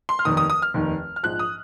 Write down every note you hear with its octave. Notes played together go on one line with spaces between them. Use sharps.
C6
F6
F1 D#2 D#3 D#6
D#6
D#6
F6
F1 D#2 D#3
F6
A#1 G#2 F3 F#6
D#6